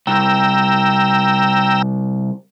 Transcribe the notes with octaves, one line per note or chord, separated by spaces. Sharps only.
C2 G5 A#5 E6